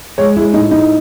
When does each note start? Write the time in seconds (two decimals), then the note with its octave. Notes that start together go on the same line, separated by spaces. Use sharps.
0.18 G#3 C#5
0.36 G#3 E4
0.54 A2 D#4
0.71 A2 D#4